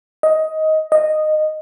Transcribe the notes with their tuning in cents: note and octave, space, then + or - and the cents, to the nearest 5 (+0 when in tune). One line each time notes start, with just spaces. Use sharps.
D#5 +15
D#5 -10